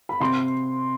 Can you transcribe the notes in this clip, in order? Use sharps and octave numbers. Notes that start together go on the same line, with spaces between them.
B5
C3 C6